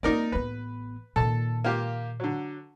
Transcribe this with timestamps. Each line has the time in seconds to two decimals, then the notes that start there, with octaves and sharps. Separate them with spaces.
0.03 A#3 C4 D#4 A#4 D5
0.32 A1 B3 B4
1.16 A#2 D#3 A4 A5
1.64 A#3 F4 G4
2.20 D3 F#3